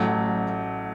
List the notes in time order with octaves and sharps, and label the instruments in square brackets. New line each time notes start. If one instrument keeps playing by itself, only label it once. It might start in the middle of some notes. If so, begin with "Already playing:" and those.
Already playing: [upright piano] A1 A2 F#3 A3